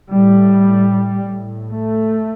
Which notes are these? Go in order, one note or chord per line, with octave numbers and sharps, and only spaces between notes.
A2 G3
A2
A3